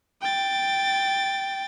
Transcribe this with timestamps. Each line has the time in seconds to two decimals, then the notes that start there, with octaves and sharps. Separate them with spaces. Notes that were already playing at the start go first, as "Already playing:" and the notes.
0.22 G5 A6